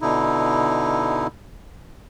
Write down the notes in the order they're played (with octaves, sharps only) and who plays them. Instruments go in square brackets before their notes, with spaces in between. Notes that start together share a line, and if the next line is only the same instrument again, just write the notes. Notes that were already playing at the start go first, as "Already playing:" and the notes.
[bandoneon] B2 D3 D#4 E4